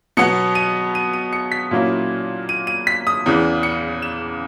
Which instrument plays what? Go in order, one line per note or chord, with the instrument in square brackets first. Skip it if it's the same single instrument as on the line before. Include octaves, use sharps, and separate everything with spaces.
[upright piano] B2 F#3 B3 C#7
D#7
D#7
D#7
C#7
B6
A#2 F#3 A#3 C#4 E4
D#7
D#7
B6
D#6
E2 C#3 E3
C#7
E7